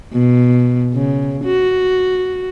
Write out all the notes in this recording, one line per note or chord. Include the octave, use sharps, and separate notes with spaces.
B2
C#3
F#4